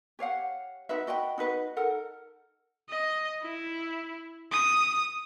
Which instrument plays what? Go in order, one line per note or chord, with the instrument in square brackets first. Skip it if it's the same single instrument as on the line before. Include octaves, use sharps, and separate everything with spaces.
[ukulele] G4 C#5 F5 F#5
D#4 F#4 B4 E5
F#4 D#5 G5 B5
D#4 F#4 B4 D#5
D#4 A4 A#4 F#5
[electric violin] D#5
E4
D#6